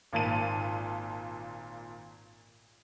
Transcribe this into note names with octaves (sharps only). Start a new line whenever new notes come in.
G#1 A#2 A5 D#7